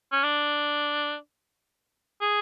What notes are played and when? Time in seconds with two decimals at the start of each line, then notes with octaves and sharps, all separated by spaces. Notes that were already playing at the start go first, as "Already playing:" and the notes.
0.12 C#4
0.23 D4
2.21 G#4